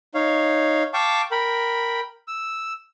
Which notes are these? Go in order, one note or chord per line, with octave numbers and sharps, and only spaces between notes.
D#4 C#5 F5
F5 G5 A5 C#6 D6
A#4 G5 B5
E6